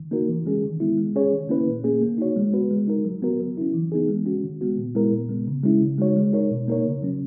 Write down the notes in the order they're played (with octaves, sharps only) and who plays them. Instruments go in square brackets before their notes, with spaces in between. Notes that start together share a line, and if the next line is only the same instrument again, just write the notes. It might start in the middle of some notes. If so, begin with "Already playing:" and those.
Already playing: [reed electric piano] D#3
A#3 D#4 F#4 A#4
E3
G#3 C#4 G#4
D#3
G#3 B3 E4
G#3
C#4 G#4 C#5
D#3
A#3 C#4 E4 B4
A#2
A#3 C#4 G#4
A#3
D#4 F#4 C#5
G#3
B3 F#4 B4
G#3
D#4 A#4
F#3
B3 F#4 A#4
F#3
C#4 E4
E3
B3 D#4 G#4
G#3
C#4 F#4
D#3
G#3 B3 F#4
A#2
G#3 B3 E4 A#4
A#2
G#3 B3
C#3
G#3 C#4 E4
C#3
G#3 D#4 F#4 C#5
G#3
D#4 A#4 C#5
B2
A#3 D#4 A#4 C#5
C#3
F#3 C#4